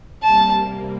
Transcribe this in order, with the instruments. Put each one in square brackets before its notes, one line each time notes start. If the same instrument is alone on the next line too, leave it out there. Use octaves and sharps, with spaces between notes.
[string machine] C3 G3 A#3 [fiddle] A5